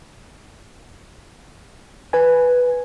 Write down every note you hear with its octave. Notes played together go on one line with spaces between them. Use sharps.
B4 G#5